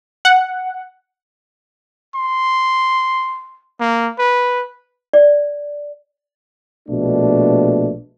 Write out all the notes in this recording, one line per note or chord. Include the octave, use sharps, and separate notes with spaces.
F#5
C6
A#3
B4
D5
A#1 B2 A3 D4